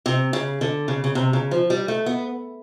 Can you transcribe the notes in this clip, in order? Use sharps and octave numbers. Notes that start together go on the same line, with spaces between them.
C3
C#3
D3
C#3
C#3
C3
C#3
F3
G3
A3
B3